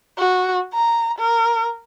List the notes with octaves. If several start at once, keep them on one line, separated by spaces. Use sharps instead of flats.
F#4
A#5
A#4